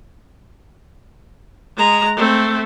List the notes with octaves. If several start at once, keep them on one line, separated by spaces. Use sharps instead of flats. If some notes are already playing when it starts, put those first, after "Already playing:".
G#3 A#5
A3 C4